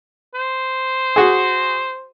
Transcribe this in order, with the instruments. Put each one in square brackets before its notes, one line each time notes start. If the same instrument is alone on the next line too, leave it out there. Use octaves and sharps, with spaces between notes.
[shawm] C5
[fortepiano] F#4 G#4